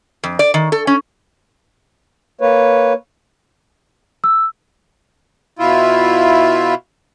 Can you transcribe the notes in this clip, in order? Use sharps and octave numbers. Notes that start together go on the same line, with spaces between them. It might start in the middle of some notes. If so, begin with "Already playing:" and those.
F2
D5
D#3
A4
C#4
A#3 B4 C#5
E6
B2 E4 F4